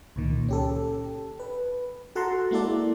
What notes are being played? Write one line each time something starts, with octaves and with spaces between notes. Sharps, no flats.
C#2 A#2 D#3
C#4 G4 A4
B4
F#4 A4 F#5 A5 A#5 C6
G#3 A#3 E4 A4 D5